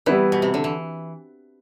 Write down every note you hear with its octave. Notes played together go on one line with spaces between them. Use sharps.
E3 G3 B3 E4 B4
B2
C3
D3
E3